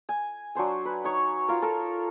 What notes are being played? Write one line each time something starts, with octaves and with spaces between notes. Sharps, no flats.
G#5
F#3 D4 C5 G#5
B4
D#4 C#5
F4 A#4
A4 A#4